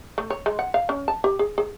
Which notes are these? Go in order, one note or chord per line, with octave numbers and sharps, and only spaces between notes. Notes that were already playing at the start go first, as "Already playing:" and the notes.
A3
C#5
G#3
F#5
F5
C#4
A5
G4
G#4
G#4